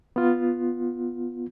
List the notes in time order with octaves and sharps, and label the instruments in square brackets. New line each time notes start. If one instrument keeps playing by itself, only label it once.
[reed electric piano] B3 F4